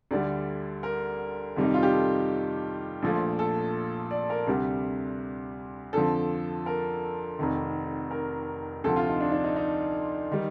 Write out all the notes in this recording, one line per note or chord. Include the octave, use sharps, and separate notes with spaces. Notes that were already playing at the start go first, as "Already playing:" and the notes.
D2 D3 G3 D5
A#4
F2 C3 D#3 G3
D#4
F4
G4
A4
A#1 A#2 F3 A3
A4
D5
A#4
D2 C3 G3
F2 D3 F3 A4
A#4
F1 F2 D#3
A#4
D2 C3 F3 A4
F4
D#4
D4
D4
D#4
D#4
D#3 G3